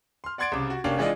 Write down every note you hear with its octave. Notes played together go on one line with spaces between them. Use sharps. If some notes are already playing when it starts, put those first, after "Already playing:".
C6 F6
D5 F#5 C6 G#6 A6 D7
C2 C#3 D6
F#4
F1 A#3 C#4 D4 F5 G5
E3 G#3 D4 F4 D5 D#5